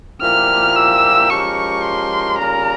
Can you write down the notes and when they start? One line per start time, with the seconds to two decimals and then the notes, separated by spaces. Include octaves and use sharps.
0.21 A#2 F3 A#3 E4 G4 F6
0.76 E6
1.29 F3 G#3 C#4 G4 A#4 C#6
1.84 C6
2.38 C#3 G3 A#3 F4 A#4 A#5